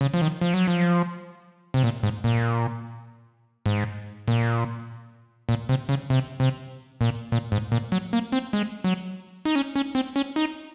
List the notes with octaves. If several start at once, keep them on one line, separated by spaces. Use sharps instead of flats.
C#3
F3
D#3
F3
F#3
F3
C3
A#2
G#2
A#2
G#2
A#2
A#2
C3
C#3
C3
C3
A#2
A#2
G#2
A#2
F#3
A#3
C4
G#3
F#3
D#4
C#4
C#4
C4
C#4
D#4